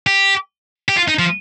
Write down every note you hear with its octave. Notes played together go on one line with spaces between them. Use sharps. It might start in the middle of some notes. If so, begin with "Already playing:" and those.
G4
G4
F4
D#4
F3